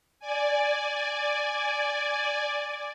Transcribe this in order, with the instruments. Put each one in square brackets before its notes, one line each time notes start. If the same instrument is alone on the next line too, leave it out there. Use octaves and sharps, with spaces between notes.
[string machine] D5 G#5